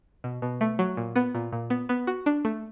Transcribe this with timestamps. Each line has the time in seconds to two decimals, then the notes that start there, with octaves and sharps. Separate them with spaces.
0.24 B2
0.42 B2
0.61 A3
0.79 F#3
0.97 A#2
1.16 B3
1.35 A#2
1.53 A#2
1.70 B3
1.89 B3
2.07 F#4
2.26 D4
2.45 A3